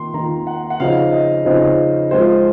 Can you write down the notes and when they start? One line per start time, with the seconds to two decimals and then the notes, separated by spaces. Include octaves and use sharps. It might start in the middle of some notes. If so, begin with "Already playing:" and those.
Already playing: D#3 A#3 F4 C6
0.14 D#3 A#3 F4 A#5
0.47 F#5
0.70 F#5
0.80 C#3 F3 C4 D#4 F5
1.12 D#5
1.45 C#3 F3 C4 D#4
2.11 F3 G#3 C4 F4 C5